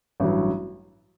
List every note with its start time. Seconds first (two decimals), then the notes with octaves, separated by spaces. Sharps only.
0.20 A1 G2 F#3